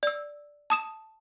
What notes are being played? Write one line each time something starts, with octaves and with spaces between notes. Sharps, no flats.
D5 E6
A5 D#6 E7